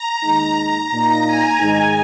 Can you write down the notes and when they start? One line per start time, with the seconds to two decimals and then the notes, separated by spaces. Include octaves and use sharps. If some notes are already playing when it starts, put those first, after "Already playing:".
Already playing: A#5
0.23 D#2 D#3 G#3 D#4
0.57 A#5
0.91 A#2 A#3 D#4 A#5
1.25 G#5
1.59 G#2 D#3 G#3 D#4 G#5